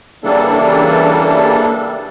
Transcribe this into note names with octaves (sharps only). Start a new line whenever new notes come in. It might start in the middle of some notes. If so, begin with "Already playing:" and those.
C#3 E3 G3 A#3 D4 A4